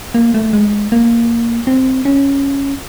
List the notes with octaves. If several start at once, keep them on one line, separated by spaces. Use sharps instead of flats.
A#3
A3
G#3
A#3
C4
C#4